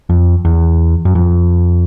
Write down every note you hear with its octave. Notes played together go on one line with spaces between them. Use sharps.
F2
E2
F#2
F2